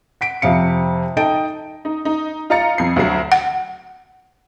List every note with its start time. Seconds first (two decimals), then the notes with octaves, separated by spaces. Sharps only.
0.21 F#5 B6 D7
0.42 F2 C3 F5 C#7
1.17 D#4 A4 D#5 G5 A5 D7
1.85 D#4
2.05 D#4
2.50 F4 D#5 A#5 A6 C#7
2.78 F2 C7
2.96 D2 F#3 F#4 C7
3.32 F#5